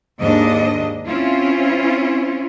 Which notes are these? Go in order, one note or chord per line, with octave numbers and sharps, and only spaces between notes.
D#2 G#2 D4 D#5
C4 C#4 E4 F4